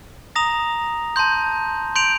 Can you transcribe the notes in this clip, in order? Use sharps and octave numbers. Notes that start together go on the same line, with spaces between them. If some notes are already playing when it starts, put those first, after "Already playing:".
A#5 D#6 A#6 F7
A5 C6 G6
C6 G6 D7 F7